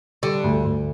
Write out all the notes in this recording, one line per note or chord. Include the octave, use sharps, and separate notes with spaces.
D3 G3
D2
D2